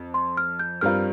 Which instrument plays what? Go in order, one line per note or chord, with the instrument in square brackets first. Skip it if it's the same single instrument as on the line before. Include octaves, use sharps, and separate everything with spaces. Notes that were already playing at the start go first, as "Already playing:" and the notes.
Already playing: [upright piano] F2
[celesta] C6
F6
G6
[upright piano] G2 G3 C4 F4 A#4 [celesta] F6